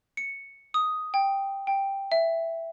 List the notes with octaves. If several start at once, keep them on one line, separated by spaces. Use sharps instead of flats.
C#7
D#6
G5
G5
E5